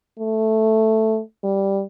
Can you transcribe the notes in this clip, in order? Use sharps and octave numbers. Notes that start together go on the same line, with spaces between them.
A3
G3